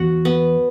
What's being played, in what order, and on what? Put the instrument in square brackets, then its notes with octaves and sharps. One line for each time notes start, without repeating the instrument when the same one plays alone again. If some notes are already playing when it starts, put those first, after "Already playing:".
Already playing: [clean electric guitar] E2 [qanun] F#4
[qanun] B3